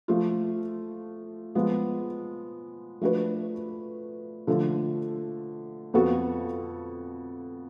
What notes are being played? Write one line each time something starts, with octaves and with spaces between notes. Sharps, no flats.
F3 A3 F4
F3 G#3 B3
F3 A3 D4 F#4 B4
D3 F3 A3 F4 A4
F2 F3 B3 F#4 A4